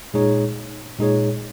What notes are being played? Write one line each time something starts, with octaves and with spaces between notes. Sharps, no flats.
A#2 G#3 D#4 G#4 C#5
A#2 G#3 D#4 G#4 C#5